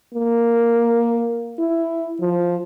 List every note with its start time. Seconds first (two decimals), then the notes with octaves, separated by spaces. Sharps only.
0.14 A#3
1.59 E4
2.21 F3